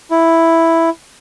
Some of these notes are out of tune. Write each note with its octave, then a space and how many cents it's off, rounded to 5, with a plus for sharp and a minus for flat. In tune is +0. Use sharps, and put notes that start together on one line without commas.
E4 +0